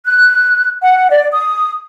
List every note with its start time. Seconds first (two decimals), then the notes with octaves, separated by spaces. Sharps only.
0.06 F#6
0.83 F#5
1.10 D5
1.32 D#6